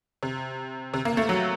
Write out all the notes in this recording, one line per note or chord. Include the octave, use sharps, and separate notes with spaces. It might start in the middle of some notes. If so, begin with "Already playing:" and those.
C3
C3
A#3
A3
F#3